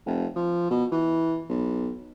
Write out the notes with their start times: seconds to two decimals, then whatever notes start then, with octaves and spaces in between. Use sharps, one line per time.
0.06 F1
0.36 F3
0.71 B2
0.92 E3
1.49 B1